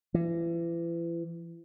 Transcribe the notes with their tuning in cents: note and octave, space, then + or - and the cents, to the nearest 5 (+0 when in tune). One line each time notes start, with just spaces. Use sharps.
E3 +35